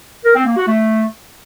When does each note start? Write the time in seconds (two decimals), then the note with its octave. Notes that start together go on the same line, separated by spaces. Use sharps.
0.25 A#4
0.35 C4
0.46 A#3
0.57 F#4
0.67 A3